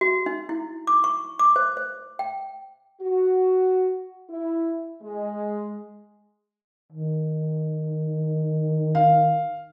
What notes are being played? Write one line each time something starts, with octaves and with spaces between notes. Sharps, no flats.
F#4
D#4
E4
D6
C#6
D6
C5
C5
G5
F#4
E4
G#3
D#3
F5